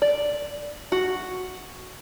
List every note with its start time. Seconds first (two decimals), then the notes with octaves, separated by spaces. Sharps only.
0.02 D5
0.92 F#4